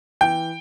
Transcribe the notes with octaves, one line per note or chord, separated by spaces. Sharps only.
E3 G5